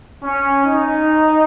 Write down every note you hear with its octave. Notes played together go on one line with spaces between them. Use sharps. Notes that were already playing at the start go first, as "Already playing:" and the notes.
C#4
D#4